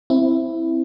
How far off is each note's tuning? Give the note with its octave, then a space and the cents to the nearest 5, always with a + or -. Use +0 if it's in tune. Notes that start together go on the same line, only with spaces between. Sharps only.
C4 +5 E4 +0